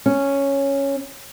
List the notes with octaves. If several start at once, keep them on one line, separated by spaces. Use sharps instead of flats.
C#4